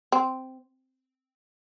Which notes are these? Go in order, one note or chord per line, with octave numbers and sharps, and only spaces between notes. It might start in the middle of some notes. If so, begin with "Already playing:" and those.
C4